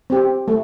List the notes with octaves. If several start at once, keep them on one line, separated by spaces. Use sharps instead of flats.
C4 G4
A3